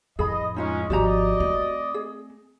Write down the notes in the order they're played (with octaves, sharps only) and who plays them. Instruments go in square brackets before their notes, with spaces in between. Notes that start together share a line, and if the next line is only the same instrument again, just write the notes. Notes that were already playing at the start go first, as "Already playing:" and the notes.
[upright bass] F2 A2 [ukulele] G#4 B5 [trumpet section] D#5
[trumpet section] G#3 C#4 [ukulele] D#4 F4 D#5
[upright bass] G#1 F3 [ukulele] F#4 G4 A#5 [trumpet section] D5 D#5
[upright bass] A3 C4
[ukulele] G#4